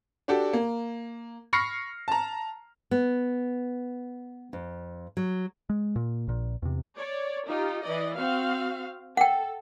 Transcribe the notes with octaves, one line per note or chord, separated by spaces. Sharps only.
D4 F#4 G4 A4
A#3
B5 C#6 F6 A#6 C7 C#7
A5 A#5
B3
F2
F#3
G#3
A#2
A#1 A#2
E2 C3
C#5 D5
D#4 F4 G4
E3 D5 D#5
C4 F#4 F5
A4 F#5 G5